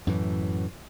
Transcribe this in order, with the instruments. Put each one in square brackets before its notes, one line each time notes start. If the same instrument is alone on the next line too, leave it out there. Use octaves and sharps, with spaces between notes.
[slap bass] F#2 A2 E3